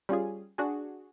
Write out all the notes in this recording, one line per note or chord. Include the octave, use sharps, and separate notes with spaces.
G3 C#4 F4 G#4
D4 F#4 G#4